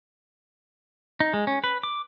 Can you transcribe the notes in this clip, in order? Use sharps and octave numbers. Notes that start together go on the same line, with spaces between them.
D#4
G#3
C#4
B4
D6